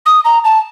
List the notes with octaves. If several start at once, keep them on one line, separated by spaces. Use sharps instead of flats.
D#6
A#5
A5